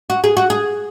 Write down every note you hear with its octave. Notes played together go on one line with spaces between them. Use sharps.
F#4
G#4
F#4
G#4